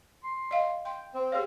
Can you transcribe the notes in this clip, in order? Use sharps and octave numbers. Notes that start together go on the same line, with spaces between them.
C6
D#5 F5
G5 C6
C4 C5
G4 G#4 C#5 F5